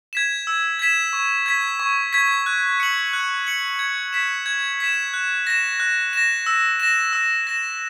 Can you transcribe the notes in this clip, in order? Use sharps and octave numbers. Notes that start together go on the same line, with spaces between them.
G#6 B6 E7
E6
G#6 B6 E7
C#6
G#6 B6
C#6
G#6 B6
F#6
C#7 F#7
F#6
C#7 F#7
G#6
B6 E7
G#6
B6 E7
F#6
A#6 E7
F#6
A#6 E7
E6
A#6 E7
E6
A#6 E7